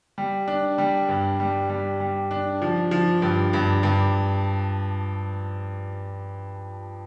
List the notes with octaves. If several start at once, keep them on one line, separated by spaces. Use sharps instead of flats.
G3
D4
G3
G2
G3
G3
G3
D4
F3
F3
G2
G2
G2